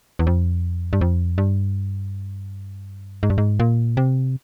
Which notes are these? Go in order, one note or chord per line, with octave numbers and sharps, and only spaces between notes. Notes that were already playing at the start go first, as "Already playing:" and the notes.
E2
F2
G2
F2
G2
G#2
G2
G#2
A#2
C3